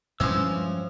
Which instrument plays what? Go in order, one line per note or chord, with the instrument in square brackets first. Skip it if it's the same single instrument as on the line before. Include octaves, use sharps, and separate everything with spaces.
[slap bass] G2 G#3 [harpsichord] E3 C4 [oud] F3 C#4 [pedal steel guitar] E6